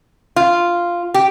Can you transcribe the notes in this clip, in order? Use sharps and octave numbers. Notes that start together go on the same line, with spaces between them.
F4
G4